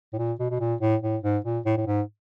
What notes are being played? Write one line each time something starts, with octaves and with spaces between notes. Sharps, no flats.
A2
A#2
B2
B2
A#2
A2
A2
G#2
A#2
A2
A2
G#2